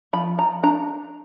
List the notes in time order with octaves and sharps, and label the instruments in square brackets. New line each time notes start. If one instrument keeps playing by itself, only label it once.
[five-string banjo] F3 B5
F3 A#5
D4 A#5